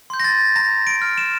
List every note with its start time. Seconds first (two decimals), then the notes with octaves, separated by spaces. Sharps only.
0.10 C6 G6
0.20 A#6
0.24 A6
0.56 A#5 A#6
0.87 D7
1.02 F6
1.18 E7